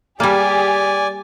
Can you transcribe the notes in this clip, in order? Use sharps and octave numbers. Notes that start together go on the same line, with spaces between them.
G3 A#3 G4 G#4 D5 G#5